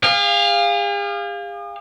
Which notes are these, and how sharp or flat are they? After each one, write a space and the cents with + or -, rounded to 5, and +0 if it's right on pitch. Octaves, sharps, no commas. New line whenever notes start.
G#4 -45 F5 +0